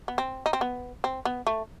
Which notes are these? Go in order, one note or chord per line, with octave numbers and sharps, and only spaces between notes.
B3
C4
D#4
C4
B3
C4
B3
A3